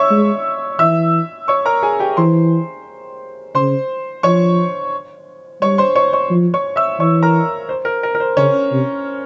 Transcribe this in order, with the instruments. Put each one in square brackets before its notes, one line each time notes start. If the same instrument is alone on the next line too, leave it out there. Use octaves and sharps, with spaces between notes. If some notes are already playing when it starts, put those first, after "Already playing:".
Already playing: [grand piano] C#5 E5 C#6 E6
[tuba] G#3
[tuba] E3 [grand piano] E5 E6
[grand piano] C#5 C#6
A#4 A#5
G#4 G#5
G4 G5
[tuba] E3 [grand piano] C5 C6
[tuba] C#3 [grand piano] C5 C6
[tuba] F3 [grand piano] C#5 C#6
[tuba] G3 [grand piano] C#5 C#6
[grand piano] C5 C6
C#5 C#6
C#5 C#6
[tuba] F3
[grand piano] C#5 C#6
E5 E6
[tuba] E3 [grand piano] C#5 C#6
[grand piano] A#4 A#5
C5
A#4
A#4
A#4
C5
[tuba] C#3 [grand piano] C#4 C#5
[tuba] C3